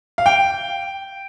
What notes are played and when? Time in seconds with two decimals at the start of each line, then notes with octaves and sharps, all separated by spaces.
0.18 F5
0.26 G5